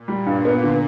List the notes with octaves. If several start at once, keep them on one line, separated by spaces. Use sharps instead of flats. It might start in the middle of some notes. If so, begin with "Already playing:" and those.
Already playing: A#2
G3
G2
B3
D3